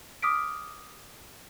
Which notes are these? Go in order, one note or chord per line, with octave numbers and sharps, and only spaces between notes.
D6 D#6 F6 B6 D7